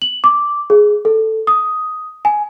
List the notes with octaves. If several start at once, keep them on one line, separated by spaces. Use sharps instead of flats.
F#7
D6
G#4
A4
D#6
G#5